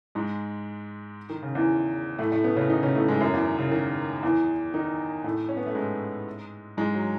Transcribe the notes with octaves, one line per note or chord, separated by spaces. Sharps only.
G#2 G#3
D#3
C#3
E2 E3
A2 A3
A2 A3
B2 B3
C#3 C#4
D#3 D#4
C#3 C#4
A2 A3
G#2 G#3
F#2 F#3
E2 E3
D#3
C#3
D#3
E2 E3
D#3 D#4
A2 A3
C#4
B3
A3
G#2 G#3
G#2 G#3
F#3